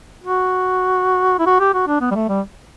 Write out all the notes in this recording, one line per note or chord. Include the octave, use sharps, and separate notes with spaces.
F#4
E4
F#4
G4
F#4
D4
B3
G3
A3
G3